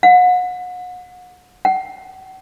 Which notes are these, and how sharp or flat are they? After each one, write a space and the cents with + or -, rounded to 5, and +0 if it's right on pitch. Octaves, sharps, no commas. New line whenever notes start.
F#5 -35
F#5 +35